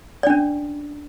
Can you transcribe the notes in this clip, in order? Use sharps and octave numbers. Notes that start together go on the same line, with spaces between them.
C#4 D4 D5